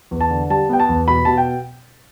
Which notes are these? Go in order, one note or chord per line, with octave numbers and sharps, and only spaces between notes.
E2
A5
D3
G3 A5
B3 G5
A5
E2
B2 B5
B2 A5
G5